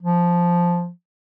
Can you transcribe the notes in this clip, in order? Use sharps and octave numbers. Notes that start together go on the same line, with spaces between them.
F3